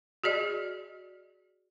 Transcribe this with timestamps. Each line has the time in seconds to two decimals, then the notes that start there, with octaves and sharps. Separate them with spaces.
0.24 F#4 G#4 D5 D#5